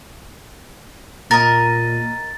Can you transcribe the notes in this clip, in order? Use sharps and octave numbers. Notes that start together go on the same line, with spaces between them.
A#2 A#4 D#5 A6